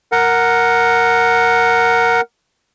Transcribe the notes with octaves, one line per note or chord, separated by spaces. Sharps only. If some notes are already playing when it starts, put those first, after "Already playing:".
A#4 F#5